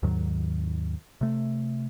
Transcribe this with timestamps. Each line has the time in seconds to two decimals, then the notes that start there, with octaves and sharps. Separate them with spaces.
0.03 D#2 G#2 D#3 F#3
1.21 C3 A3